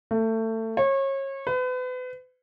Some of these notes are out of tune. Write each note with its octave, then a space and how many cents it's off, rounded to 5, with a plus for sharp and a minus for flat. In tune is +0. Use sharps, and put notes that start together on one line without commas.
A3 +25
C#5 -30
B4 +35